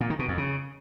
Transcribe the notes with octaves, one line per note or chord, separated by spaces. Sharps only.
A#2
D#3
B2
F2
C#3